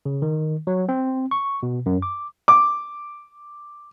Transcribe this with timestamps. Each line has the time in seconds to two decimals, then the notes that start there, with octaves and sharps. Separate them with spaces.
0.05 C#3
0.22 D#3
0.67 F#3
0.89 C4
1.31 C#6
1.63 B2
1.86 F#2
2.02 D6
2.48 D6